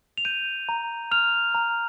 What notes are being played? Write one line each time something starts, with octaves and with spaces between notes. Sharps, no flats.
F7
G6 D#7
A#5
F6 F7
A#5